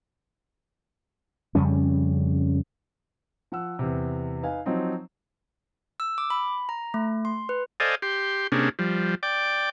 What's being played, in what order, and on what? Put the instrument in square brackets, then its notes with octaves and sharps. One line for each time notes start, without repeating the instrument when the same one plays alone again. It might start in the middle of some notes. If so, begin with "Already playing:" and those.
[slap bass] F2 C#3 G3 C#4
[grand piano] F3 F#5 E6
E2 C3
D#4 B4 F5 G#5
F3 F#3 C4 D#4
[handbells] E6
D6
B5
A#5
A3
C6
B4
[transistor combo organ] A4 C5 D5 D#5 F5 G#5
G4 C6
C3 A#3 C#4 D4 G#4
F3 G3
D5 G5 D6